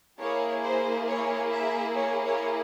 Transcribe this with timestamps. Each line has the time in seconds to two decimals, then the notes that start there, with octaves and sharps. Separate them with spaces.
0.21 A#3 E4 G#4 C#5
0.64 C5
1.08 C#5
1.52 E5
1.95 C#5
2.25 C#5